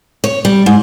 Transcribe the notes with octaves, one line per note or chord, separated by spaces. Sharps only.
C#5
G3
G#2